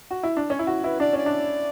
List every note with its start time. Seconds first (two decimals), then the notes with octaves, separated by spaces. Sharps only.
0.11 F#4
0.23 E4
0.37 D4
0.50 C#4 C#5
0.59 E4
0.67 F#4
0.84 E4 B4
1.00 D4 D5
1.13 C#4 D5
1.26 D4